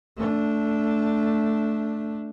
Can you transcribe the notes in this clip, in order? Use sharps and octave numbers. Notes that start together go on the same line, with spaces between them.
A3 D4